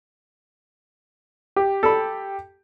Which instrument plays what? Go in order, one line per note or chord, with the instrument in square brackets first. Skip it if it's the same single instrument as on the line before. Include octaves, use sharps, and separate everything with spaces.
[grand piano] G4
[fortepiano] A4 B5